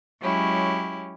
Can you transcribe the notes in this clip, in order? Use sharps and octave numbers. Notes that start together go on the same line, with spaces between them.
F#3 G#3 C#4 E4 G4